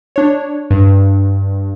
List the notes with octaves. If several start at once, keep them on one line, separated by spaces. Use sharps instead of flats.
D4 C#5
G2